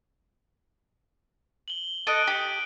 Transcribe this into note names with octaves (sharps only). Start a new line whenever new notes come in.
F#7 G7
A4 D#5 F#6 D7 D#7
G4